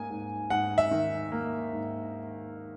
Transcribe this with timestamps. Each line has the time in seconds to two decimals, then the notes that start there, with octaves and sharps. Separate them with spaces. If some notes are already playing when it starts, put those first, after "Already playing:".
Already playing: G#2 A#3 G#5
0.10 G#2
0.50 G#2 F#5
0.78 E5
0.91 D#3
1.32 A#3
1.73 G#2